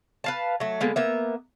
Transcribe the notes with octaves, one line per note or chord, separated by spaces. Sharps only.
B4 F5 A5
F#3 A3
D3 G#3 A#3 B3
A#3 B3 E5